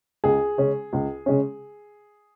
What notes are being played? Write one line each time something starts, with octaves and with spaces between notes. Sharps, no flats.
C#2 G#4
C#3 G#3 C#4
C#2
C#3 G#3 C#4